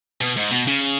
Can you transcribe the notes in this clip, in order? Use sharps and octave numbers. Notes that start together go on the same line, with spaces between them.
B2
G#2
B2
C#3